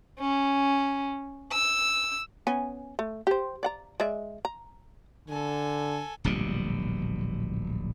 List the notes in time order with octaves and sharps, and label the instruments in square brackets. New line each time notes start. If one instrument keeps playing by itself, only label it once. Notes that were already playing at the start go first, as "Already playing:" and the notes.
[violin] C#4
E6
[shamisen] B3 C#4 G#5
A3
G4 C5
D5 F#5 A#5
G#3 D5 E5
A#5
[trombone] D3 [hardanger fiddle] A4 G#5
[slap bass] D1 A#1 B2 G3